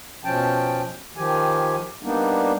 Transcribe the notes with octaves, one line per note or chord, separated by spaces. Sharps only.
B2 F3 C#4 G5 A5
D#3 F3 G4 G#5
G3 A#3 B3 D4 D#4